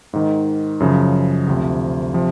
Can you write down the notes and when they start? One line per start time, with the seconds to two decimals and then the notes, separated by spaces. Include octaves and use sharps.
0.13 G#2 D#3
0.80 F#2 C#3 F3
1.47 D2 C3 F3
2.14 C3 F3